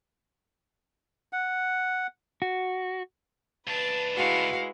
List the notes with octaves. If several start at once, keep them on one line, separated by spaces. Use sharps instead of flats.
F#5
F#4
C#2 D4 B4 A5
G#3 E4 F#4 F5